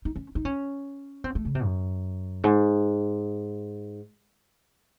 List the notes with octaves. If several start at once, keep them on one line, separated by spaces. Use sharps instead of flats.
D#4
C#4
D#4
C#4
C4
A3
C#3
C3
F#2
G#2